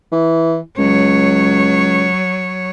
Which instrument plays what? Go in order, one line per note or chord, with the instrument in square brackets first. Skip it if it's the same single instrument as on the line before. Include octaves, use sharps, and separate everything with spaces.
[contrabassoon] E3
[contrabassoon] C#2 [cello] F#3 C#5